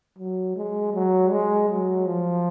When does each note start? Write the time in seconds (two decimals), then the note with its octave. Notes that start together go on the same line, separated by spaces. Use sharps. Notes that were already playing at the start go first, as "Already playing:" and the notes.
0.18 F#3
0.56 G#3
0.94 F#3
1.31 G#3
1.70 F#3
2.06 F3